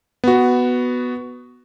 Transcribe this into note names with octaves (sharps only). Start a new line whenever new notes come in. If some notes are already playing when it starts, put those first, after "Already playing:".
B3 F#4